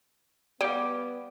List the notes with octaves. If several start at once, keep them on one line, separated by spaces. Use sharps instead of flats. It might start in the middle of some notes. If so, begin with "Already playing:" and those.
G3 B3 D5 F5 D6